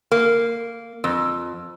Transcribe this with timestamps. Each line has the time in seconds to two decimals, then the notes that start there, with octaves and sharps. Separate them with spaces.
0.12 A#3
1.04 F2